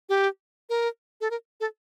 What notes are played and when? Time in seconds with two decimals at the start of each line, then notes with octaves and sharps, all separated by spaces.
0.09 G4
0.70 A#4
1.21 A4
1.31 A#4
1.60 A4